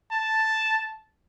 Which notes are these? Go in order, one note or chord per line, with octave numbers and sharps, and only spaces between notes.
A5